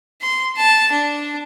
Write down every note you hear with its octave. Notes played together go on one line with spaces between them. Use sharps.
C6
A5
D4